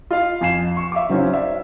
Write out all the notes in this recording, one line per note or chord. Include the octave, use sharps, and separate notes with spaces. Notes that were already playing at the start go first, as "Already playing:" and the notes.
F4 D#5 F5
F2 G#5 C7 E7
C#6
E5 F5 D6
C#3 F#3 C4 C#4 D#4
D5 E5